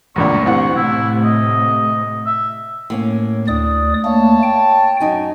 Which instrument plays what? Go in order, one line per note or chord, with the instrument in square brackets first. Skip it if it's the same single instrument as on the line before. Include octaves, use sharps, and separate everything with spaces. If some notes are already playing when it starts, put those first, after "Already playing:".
[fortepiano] C#2 F#2 A#2 [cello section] A3 A#3 D4 [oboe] C#6
[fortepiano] C2 E3 F#5 [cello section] C4
[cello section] A2 C3 A3 [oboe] E4
[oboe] D#5
E5
[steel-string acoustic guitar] A2 A#3 C#4
[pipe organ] D2 D5 D#6 [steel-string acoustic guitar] D4
[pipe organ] A3 A#3 [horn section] C#5 A5
[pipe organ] G5
[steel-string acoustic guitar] F#2 D#4 G#5